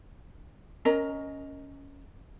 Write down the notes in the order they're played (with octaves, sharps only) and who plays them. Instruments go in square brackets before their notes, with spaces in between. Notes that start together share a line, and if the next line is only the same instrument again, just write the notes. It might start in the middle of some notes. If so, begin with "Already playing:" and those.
[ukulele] C#4 A#4 D#5 A#5